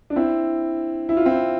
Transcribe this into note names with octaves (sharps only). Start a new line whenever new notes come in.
D4
C4 E4
E4
F4
C4 E4